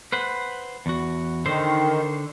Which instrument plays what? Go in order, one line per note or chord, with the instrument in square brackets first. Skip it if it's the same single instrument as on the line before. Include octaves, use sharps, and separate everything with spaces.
[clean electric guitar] B4 C5 F#5
E2 F#4
[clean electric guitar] D3 C5 [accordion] D#3